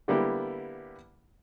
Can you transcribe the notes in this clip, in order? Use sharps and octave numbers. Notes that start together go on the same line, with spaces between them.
D3 G3 A#3 B3 E4 G4